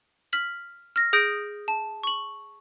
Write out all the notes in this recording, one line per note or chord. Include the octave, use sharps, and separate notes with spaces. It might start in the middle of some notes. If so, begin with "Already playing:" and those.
F6 B6 F#7
F6 A#6
G#4 D#6 G6 A#6 D7
A5
C#6 F#7